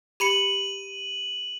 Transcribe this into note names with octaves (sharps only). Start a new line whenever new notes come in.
G4 B5 C#7 D#7 F#7